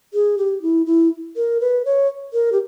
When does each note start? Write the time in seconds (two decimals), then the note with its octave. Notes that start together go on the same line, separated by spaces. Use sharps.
0.14 G#4
0.38 G4
0.62 E4
0.86 E4
1.36 A#4
1.60 B4
1.85 C#5
2.33 A#4
2.52 G4